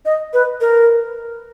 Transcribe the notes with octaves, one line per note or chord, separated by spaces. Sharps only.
D#5
B4
A#4